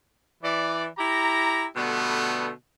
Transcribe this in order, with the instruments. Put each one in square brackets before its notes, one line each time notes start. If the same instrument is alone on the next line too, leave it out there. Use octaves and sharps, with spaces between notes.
[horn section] E3 D5
E4 G4 A#5
B2 D3 G3 A3 B3